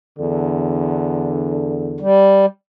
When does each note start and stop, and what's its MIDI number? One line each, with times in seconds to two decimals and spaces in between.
0.19 2.05 40
0.19 2.05 50
2.00 2.46 55